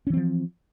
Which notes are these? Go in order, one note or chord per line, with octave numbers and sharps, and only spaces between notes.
E3 F3 C4 C#4